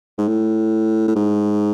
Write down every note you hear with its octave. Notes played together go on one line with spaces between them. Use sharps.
G#2
A2
A2
G#2